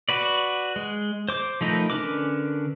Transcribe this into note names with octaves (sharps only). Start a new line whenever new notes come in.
F#4 B4 D5
G#3
C5 D6
F3 A3 D#4 A#4 B4
D3 C#4 A#4 B4 D6